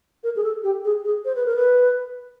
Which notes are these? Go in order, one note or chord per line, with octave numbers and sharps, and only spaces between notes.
A#4
G#4
A4
G4
G#4
G#4
C5
B4
A#4
B4